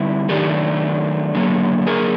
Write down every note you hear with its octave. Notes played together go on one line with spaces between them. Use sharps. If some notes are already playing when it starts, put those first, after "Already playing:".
Already playing: D3 G3 C4 E4
D#3 F#3 A3 D4 G4 A4
D3 F#3 A#3
G#4 A#4